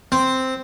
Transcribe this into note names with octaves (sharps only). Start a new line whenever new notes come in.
C4